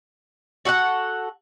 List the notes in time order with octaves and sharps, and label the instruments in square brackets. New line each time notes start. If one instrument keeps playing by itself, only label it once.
[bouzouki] F#4 A4 D5 F#5